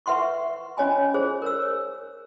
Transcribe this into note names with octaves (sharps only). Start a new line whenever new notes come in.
B4 E5 F#5 C6 C#6
C#4 C#5 D#5 G#5 B5
G#4 C5
A#4 C#5 E6